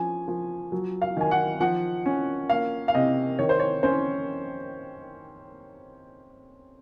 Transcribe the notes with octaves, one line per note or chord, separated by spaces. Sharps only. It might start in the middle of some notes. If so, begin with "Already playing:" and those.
Already playing: F3 C#4 G#5
F3
F#3
F5
D#3 G#5
F#5
F3 F#5
C#4
A#3 F5
F5
C3 D#5
D#3 C#5
C5
C#5
C#4 C5